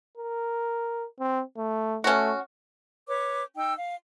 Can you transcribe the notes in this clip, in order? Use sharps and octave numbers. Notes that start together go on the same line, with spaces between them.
A#4
C4
A3
A3 C#4 F#4
B4 C#5 D6
D#4 G5 E6
F5